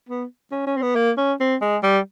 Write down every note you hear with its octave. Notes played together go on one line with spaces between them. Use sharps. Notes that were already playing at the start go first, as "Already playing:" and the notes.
B3
C#4
C#4
C4
B3
A#3
C#4
C4
G#3
G3